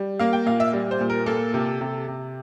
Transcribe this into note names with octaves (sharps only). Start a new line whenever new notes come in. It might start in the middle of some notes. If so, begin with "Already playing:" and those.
Already playing: G3
A#3 F5
G5
A#2 F5
E5
G3
C5
A#2
A#4
A#3 A4
C3
C3
C3